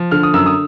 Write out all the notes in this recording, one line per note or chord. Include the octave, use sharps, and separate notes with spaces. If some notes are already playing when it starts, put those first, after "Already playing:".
Already playing: F3
D3 F6
D#6
F#2 E6
D#6